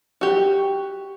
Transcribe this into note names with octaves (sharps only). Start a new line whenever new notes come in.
F#4 G4